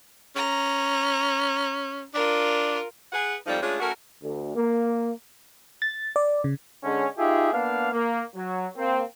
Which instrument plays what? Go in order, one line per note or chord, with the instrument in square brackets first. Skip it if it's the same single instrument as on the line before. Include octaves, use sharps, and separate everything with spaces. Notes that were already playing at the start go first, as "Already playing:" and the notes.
[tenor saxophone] C#4 [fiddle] A#5
[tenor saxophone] D4 [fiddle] F4 A#4
[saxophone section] G#4 B4 F#5
F2 G#2 F3 G3 D#4 F4
G#3 A3 C#4 D4 F4 G#4
A3 C#4 F#4 A#4
[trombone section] D2
A#3
[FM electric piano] A6
D5
C#3
[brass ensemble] D3 G#3 C#4
D#4 F4 G4 G#4 E5
A#3 B3 D4 F5
A#3
F#3
A#3 C4